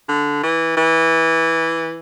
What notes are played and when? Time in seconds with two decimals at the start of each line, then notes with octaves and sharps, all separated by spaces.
0.09 D3
0.43 E3
0.77 E3